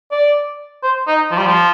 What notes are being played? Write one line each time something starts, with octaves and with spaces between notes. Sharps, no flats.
D5
C5
D#4
F3
G3
F3